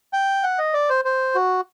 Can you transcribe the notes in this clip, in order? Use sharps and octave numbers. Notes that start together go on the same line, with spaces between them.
G5
F#5
D#5
D5
C5
C5
F#4